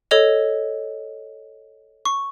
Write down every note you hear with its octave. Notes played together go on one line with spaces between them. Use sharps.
A4 C#5 D#5 F7
C#6